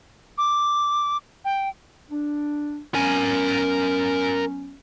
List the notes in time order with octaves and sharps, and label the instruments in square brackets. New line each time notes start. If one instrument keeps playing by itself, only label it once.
[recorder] D6
G5
[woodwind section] D4
[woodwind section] F#3 B3 C#4 [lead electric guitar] A#4 G#5